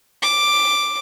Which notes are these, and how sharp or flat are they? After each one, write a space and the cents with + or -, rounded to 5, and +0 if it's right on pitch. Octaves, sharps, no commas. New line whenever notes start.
D6 +5